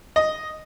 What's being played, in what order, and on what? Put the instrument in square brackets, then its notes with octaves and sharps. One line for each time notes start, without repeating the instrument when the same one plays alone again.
[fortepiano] D#5